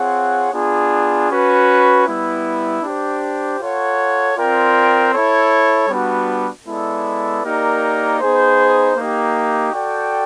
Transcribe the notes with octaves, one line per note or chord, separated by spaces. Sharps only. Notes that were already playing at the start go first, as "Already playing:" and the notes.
Already playing: C4 F4 G#4 C#5 F#5
B3 D4 F4 G#4
C#4 F#4 B4
G3 B3 E4
D4 G4 C5
F4 A4 C#5 F#5
C4 F4 A#4 D5 G5
E4 A4 C#5
G3 B3 D4 F#4
G#3 B3 E4 A4 D5
A#3 D#4 G4 A#4 D5
B3 D#4 G#4 C5
A#3 D#4 G4
F#4 A4 D5 G5